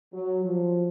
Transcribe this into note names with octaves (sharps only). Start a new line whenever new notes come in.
F#3
F3